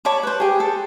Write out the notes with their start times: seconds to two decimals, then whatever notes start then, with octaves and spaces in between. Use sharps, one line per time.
0.05 C#5 A5 B5 D6
0.23 B4 C5
0.40 G4 G#4
0.60 A4